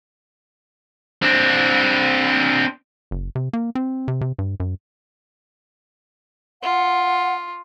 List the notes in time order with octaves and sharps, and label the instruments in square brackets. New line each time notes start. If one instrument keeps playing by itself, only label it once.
[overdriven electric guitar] C4 D4
[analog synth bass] F#1
C3
A#3
C4
C3
C3
G2
F#2
[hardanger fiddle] F4 [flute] F#5